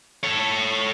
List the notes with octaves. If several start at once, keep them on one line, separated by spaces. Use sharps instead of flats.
A4 C#5